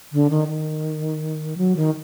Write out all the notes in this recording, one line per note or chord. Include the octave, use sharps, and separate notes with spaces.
D3
D#3
D#3
F#3
D#3